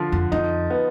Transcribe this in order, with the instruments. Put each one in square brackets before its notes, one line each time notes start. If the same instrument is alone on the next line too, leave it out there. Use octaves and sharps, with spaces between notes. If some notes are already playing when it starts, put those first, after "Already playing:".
Already playing: [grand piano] D3 F3
[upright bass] F2
[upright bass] F2 [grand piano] D#4
[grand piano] B3